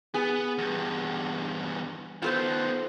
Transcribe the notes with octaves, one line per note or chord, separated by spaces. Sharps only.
B3 G#4
E2 G2
D#3 B3 F4 A4 C5